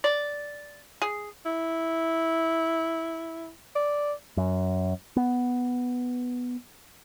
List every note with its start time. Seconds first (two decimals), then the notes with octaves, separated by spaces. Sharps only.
0.04 D5
1.02 G#4
1.46 E4
3.76 D5
4.37 F#2
5.16 B3